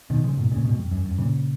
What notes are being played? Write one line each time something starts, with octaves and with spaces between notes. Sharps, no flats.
B2 D#3
C#3 F3
G#2 B2
A#2 C#3
G#2 B2
F2
F#2
F#2
A#2 C#3